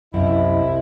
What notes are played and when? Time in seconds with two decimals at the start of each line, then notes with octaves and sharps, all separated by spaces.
0.14 C2 F#2 E4 D#5